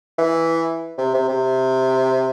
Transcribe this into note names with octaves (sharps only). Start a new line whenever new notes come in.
E3
C3
C3
C3